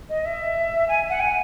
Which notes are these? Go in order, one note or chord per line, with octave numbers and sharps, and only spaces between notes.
D#5
E5
G#5
F#5
G#5